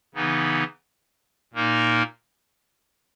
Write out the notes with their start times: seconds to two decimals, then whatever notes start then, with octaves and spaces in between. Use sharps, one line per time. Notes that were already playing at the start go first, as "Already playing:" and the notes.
0.15 C#3 E3 B3 D#4
1.53 A#2 A#3 D#4 A#4